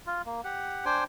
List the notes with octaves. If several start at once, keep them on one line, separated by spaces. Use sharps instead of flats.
F4
A#3
G4 F#5
D4 C5 G5 G#5